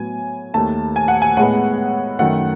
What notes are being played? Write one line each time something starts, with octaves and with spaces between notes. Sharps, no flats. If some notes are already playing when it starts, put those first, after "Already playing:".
Already playing: A2 F#3 B3 G#5
D#2 D#3 A3 A5
G#5
F#5
G#5
A2 G#3 B3 F#5
F#2 D#3 A3 F#5